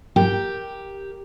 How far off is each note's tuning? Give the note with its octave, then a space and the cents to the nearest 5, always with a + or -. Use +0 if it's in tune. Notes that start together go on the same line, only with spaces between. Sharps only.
G4 +0 A#4 +0 G5 +0